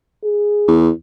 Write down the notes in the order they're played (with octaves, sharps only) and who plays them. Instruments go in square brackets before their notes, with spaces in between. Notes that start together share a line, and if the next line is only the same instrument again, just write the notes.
[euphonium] G#4
[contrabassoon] E2